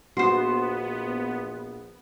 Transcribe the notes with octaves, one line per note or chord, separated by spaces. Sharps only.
A#1 B3 D4 F#4 C5 C6